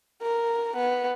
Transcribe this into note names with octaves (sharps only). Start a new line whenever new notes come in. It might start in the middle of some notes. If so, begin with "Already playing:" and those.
A#4
B3